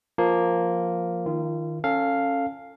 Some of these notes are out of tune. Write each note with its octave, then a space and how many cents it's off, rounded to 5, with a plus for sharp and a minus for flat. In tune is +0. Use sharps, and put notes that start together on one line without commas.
F3 +0 A#3 +0
D#3 +0 F4 -30
C#4 -10 A4 +15 F5 +0